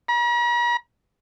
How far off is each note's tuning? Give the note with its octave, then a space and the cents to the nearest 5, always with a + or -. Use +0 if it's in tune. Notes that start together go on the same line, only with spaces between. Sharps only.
A#5 +45